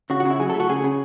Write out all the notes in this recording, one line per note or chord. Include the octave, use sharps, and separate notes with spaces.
C#3 F#4
F#4
C#3 E4
F#3 G#4
A4
A3
F#4
C#3 G#4
C#3